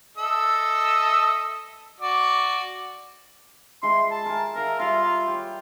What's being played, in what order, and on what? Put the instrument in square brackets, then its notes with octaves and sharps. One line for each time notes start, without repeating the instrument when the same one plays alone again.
[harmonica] A4 D#5 E5
F#4 D5
[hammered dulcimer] G#3 E4 [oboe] C6
[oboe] A5
[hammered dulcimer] A#4 G#5
[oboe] A#4 [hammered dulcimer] E5 F5 C6
[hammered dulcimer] G3 E4 [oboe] F4
[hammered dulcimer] G4 C#5